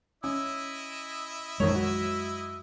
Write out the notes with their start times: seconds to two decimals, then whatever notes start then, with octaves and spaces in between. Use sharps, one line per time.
0.24 C#4 E4 D#5 E5
1.60 A#1 F#2 D#3 G#3 C#5
1.75 F#4